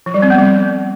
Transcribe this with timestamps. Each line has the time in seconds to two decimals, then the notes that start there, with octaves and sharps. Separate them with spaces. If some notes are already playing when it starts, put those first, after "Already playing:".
0.06 F3
0.14 G3
0.22 C4
0.30 B3
0.38 G3